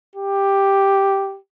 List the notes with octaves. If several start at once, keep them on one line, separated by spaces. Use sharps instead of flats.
G4